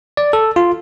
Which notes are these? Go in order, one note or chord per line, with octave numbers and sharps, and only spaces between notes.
D5
A4
F4